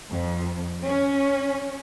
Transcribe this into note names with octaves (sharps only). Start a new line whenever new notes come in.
F2
C#4